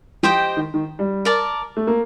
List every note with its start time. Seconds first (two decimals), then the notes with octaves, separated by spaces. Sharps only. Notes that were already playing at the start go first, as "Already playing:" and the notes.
0.23 F3 G4 C5 D#5 G5
0.57 D#3
0.74 D#3
0.99 G3
1.25 A#4 D5 A5
1.77 A3
1.87 A#3